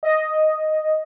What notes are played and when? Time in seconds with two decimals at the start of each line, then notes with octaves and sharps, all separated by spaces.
0.03 D#5